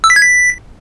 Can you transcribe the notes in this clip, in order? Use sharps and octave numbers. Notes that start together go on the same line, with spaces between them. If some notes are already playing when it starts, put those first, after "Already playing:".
E6
B6
G#6
B6